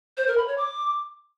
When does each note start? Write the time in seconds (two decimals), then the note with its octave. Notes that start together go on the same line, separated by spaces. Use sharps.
0.17 C5
0.27 A#4
0.38 B5
0.48 C#5
0.58 D6